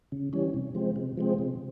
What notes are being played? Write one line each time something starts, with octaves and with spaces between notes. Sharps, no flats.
C#3
E3 G3 C#4
C3
F3 G#3 C4
C3
F3 G#3 C4
C3